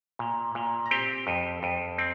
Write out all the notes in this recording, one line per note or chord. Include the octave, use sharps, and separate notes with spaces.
A#2
A#2
A#5
C4 G4 G5
F2
F2
C4